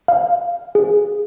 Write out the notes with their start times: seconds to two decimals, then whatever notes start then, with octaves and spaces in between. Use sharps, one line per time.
0.08 F5
0.75 G#4